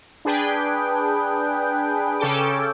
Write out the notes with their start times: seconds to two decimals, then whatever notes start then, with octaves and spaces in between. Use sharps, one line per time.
0.25 D4 G#4 B4 G5
2.19 C#3 C#4 A4 G5 D6